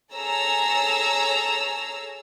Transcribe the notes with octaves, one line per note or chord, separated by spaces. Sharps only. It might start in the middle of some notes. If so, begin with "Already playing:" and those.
G#4 A4 C#5 G#5 A#5 E6